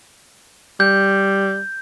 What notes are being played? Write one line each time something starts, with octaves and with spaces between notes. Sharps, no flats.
G3 G6